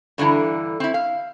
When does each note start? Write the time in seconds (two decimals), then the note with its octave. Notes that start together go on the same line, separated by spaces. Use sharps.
0.18 G2 D3 E3 E4 A#5
0.80 C4 E4
0.94 F5